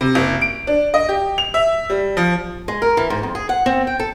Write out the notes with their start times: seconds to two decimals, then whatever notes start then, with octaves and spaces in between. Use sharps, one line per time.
0.01 C3
0.15 F#1
0.41 D7
0.67 D4
0.94 D#5
1.09 G4
1.38 F7
1.54 E5
1.90 G3
2.17 F3
2.68 G#3
2.82 A#4
2.97 E3
3.10 G#2
3.23 F2
3.35 G#4
3.49 F#5
3.66 C4
3.87 G5
3.99 A4